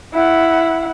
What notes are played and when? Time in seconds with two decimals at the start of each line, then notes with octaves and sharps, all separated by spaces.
0.13 E4 F#5